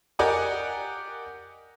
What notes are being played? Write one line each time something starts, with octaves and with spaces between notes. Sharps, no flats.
G4 A#4 D5 D#5 F#5 G#5